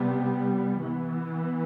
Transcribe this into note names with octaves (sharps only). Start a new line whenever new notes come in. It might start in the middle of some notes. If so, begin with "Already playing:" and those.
Already playing: C3 G3 B3
E3 B3